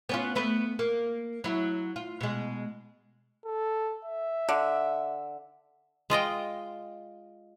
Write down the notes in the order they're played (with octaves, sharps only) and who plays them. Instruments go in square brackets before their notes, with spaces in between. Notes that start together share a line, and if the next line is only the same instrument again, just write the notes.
[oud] B3 C#4 F4
A3 B3 B4
A#3
F#3 E4
F4
B2 G#3
[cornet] A4
E5
[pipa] D3
[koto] G#3 F4 D#5 G5